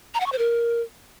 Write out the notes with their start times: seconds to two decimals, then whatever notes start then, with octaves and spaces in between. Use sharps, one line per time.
0.14 A#5
0.20 F#5
0.26 C#6
0.32 C5
0.38 A#4